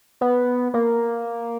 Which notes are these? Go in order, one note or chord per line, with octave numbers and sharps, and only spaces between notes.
B3
A#3